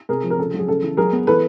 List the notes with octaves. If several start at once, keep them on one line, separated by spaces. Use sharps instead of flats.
C3 G#4 A#4
F3
A#4
C#3 A4
F#3
G#4
C#3 A4
E3
F#3 G#4 A#4
B3
E3 A4 B4